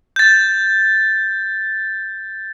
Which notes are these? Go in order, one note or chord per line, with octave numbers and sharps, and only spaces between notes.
G6 A6